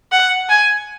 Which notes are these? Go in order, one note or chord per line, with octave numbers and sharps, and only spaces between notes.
F#5
G#5